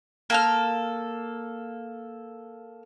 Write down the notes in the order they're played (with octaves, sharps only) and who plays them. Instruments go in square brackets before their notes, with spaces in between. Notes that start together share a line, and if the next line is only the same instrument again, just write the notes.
[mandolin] A#3 A4 F6